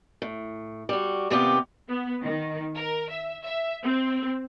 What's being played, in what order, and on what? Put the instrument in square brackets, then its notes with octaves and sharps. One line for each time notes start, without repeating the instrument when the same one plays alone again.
[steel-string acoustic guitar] A2
G3 F#4
D#2 C3 B3 C4 F4 G4
[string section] B3
D#3
A#4
E5
E5
C4